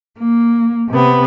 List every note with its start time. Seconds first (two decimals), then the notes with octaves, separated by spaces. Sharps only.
0.19 A#3
0.90 C3 B3